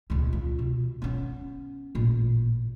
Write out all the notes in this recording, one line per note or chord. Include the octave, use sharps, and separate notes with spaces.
D#1 C#2
F4
B2
B3 C#4
A1 A#2